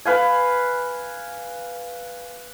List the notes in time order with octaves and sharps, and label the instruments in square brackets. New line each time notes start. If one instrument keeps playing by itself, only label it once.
[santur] B4 F5 G#5